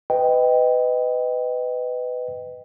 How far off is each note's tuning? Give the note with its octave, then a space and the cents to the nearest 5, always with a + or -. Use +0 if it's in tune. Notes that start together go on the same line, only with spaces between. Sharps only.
B4 +20 D#5 +0 G5 +0